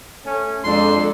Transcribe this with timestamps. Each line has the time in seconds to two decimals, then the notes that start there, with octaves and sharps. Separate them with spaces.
0.25 A3 C#4
0.64 F2 G#3 D4 A4 C6